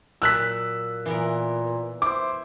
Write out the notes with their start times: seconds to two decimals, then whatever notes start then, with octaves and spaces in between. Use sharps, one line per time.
0.22 A#2 F#3 E6 F#6 B6
1.06 A#2 E3 B3 A#4
2.02 E4 C5 D6